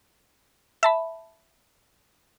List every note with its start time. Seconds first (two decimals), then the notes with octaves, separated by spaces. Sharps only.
0.83 E5 A5 B5